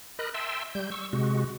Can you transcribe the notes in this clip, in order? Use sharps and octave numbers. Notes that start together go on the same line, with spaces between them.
A#4 D#5 B5 F#6
E5 G5 A5 C6 E6
G3 G6
C#6 E6
C3 G#3 F#4